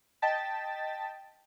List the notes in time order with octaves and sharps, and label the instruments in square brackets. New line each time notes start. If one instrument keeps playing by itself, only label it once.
[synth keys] D#5 G5 A5 A6 B6